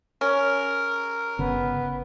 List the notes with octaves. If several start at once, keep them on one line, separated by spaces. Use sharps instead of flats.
C#4 A#4
G1 C#3 B3